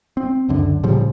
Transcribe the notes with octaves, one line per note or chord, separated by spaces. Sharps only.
C4
C#2 F#2 D3
A2 C#3 F3 G3